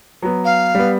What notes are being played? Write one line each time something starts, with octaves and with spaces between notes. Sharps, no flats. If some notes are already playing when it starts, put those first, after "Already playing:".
F#3 B3
F5
G3 B3